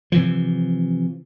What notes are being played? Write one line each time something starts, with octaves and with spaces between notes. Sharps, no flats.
C3 E3 F3